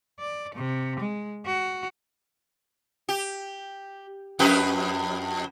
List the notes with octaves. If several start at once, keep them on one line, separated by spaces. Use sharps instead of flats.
D5
C3
G#3
F#4
G4
F2 G4 B4